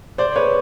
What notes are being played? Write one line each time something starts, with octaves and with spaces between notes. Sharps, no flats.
C5 D5
B4 C#5